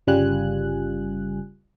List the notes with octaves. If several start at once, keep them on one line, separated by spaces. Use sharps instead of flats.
G1 C#3 G3 F4 G#5 F#6